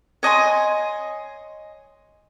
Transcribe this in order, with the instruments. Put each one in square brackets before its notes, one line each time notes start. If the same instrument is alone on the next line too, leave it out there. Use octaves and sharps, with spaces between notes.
[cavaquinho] C#5 D#5 G#5 C6